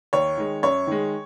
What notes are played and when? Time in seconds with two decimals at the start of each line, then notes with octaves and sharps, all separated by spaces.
0.13 D#2 C#5
0.37 D#3 G#3
0.63 F#2 C#5
0.87 D#3 G#3